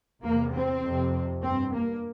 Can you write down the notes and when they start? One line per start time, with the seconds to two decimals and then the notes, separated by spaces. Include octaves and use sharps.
0.22 E2 C3 A#3
0.52 C4
0.83 F2 C3
1.42 G2 C4
1.72 A#3